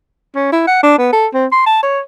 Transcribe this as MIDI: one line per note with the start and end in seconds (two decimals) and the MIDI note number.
0.35 0.50 61
0.52 0.64 64
0.67 0.80 78
0.83 0.95 62
0.98 1.11 59
1.13 1.27 69
1.34 1.46 60
1.52 1.65 84
1.66 1.81 81
1.82 2.00 73